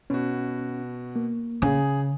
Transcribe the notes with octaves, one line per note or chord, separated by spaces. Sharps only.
B2 C#4 F#4
A#3
C#3 G#4